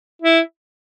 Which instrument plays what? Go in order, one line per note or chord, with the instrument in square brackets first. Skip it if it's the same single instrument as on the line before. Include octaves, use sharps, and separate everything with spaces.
[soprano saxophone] E4